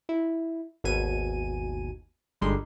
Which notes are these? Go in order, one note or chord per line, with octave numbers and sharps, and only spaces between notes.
E4
G#1 D#2 B2 G#5 D#7
G1 D3 G3 G#3 D#4 C6